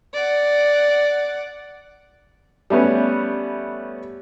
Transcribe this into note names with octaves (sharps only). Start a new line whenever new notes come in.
D5 F#5
G3 A3 B3 C#4 B4